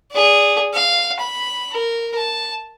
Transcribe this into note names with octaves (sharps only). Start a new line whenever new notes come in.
G#4 D5
F5
B5
A#4
A5